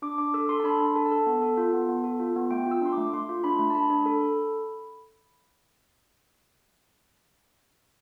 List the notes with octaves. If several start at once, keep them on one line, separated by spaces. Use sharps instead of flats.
D4 D6
D4 D6
A4 E6
A4 C6
A5
D4 B5
D4 A5
A4
A5
A4
B3
A4
F4
B3
B3
A4
F4
B3
A3 G5
F4
E6
D4 C6
D6
A3
A3 C6
F4
D4 B5
A3
A5
D4 B5
D4
A4
A4